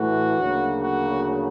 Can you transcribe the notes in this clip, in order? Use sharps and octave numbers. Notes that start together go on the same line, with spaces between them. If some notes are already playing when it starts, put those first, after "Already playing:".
Already playing: A2 E3 A3 F#4
D2 C#3 F#3 A#3
F#4